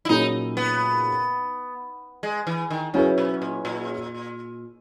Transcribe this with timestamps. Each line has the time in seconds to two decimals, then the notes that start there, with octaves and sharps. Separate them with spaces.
0.05 E4
0.09 A#2 F#3 C#4 D#4 G#4
0.57 B3
2.23 G#3
2.47 E3
2.70 D#3
2.94 C#3 F#3 C#4 E4 G#4 B4
3.18 B2
3.42 A#2
3.65 A#2